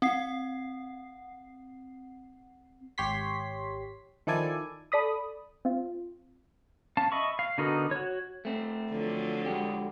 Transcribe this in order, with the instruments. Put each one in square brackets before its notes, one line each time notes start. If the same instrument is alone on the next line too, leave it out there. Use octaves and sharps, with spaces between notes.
[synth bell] C4 F#5 C7
[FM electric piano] G#1 G4 C#5 C6 B6
D#3 F3 E4 A4 D5 G#5
[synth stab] A4 D5 B5 D#6
C4 F4
[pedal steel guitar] C#4 F5 A5
D#5 E5 B5 C#6
F5
D3 B3 D#4 F#4 A#4
F#4 C#5
[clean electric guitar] A3 C4
[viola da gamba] D3 F3 F#3
[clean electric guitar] G#3 F#4 G4